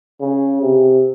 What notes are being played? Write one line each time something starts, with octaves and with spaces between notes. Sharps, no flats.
C#3
C3